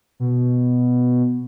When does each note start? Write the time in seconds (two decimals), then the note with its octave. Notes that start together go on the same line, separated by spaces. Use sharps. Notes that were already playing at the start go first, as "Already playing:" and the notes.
0.20 B2